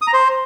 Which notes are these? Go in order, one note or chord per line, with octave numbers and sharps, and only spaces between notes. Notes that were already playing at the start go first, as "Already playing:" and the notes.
D#6
A#5
C5